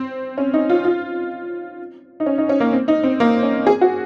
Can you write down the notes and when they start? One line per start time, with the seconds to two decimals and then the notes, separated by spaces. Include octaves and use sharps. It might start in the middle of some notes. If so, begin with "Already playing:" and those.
Already playing: C4
0.38 C#4
0.53 D#4
0.70 F4
0.85 F4
2.20 D#4
2.26 C#4
2.38 D#4
2.49 C#4
2.60 A#3
2.73 C4
2.88 D#4
3.04 C4
3.20 A#3
3.43 C#4
3.67 G#4
3.81 F#4